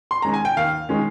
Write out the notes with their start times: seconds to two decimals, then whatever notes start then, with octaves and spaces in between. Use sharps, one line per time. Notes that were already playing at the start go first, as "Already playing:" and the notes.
0.11 C6
0.22 D#3 G#3 C#4 A#5
0.34 G#5
0.45 G5
0.57 D#2 F5
0.89 D#3 G#3 C#4